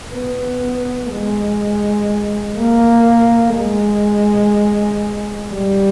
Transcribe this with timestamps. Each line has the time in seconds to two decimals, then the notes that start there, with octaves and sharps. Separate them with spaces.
0.14 B3
1.12 G#3
2.58 A#3
3.57 G#3
5.53 G3